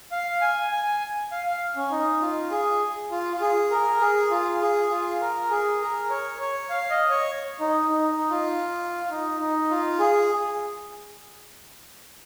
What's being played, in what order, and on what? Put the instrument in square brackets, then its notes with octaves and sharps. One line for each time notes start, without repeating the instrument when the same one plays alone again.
[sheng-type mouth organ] F5
G#5
G#5
F5
F5
C#4
D#4
F4
G#4
F4
F4
G#4
A#4
G#4
F4
G#4
F4
A#4
G#4
A#4
C#5
C#5
F5
D#5
C#5
D#4
D#4
D#4
F4
F4
D#4
D#4
F4
G#4